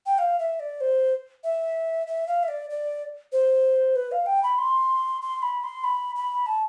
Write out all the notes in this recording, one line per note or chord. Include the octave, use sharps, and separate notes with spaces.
G5
F5
E5
D5
C5
E5
E5
F5
E5
D5
D5
C5
B4
F5
G5
B5
C6
C6
B5
C6
B5
B5
A5